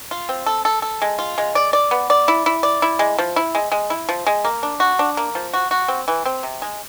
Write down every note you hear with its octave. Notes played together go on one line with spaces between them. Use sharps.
F4
C4
A4
A4
A4
G#3
F4
G#3
D5
D5
B3
D5
E4
E4
D5
E4
G#3
F3
E4
G#3
G#3
E4
F3
G#3
A#3
D4
F#4
D4
A#3
F3
F#4
F#4
C4
E3
C4
C3
G#3